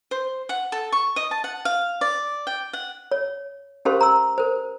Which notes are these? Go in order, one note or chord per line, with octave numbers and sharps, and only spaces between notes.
C5
F#5
A4
C#6
D#5
A5
F#5
F5
D5
G5
F#5
C#5
C#4 G4 A#4 C5 F5 C6
A#5 C6 E6
A#4 C5